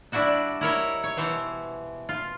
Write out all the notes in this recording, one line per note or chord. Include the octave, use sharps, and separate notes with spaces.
G3 D4 E4 F#4 E5
E4 A#4 C#5 D#5
C#5
B2 E3 C5
F4